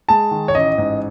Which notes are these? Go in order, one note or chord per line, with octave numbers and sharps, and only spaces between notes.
G#3 A5
D#3
C#5
A1 D#5
G#2